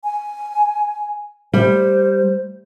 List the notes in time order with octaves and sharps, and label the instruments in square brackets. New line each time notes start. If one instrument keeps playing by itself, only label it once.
[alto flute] G#5
[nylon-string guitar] G3 [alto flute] C5